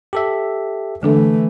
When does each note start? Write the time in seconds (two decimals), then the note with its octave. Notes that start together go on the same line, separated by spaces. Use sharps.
0.13 G4 A4 E5
1.03 D3 E3 A3 D4 A4